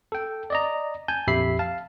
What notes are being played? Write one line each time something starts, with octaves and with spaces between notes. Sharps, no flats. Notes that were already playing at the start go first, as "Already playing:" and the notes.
A4 G5
D5 D#5 A#5
G#5 A5 G6
A#1 F2 G4 E5 B5 C7
F5 A5